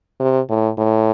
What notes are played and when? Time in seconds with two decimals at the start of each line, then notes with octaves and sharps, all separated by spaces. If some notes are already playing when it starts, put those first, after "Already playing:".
0.20 C3
0.50 A2
0.78 A2